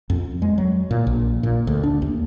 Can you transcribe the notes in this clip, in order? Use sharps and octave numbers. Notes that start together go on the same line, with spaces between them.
F2
G#3
F#3
A#2
A#1
A#2
D2
D4
D#2